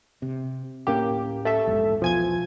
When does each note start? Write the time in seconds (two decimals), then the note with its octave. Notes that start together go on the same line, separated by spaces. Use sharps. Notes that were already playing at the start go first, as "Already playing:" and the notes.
0.22 C3
0.87 D1 A2 A#3 C#4 G4
1.45 A3 A4 E5
1.67 A#1 E2 G#2
2.02 B1 E2 B2 F3 G#5 G#6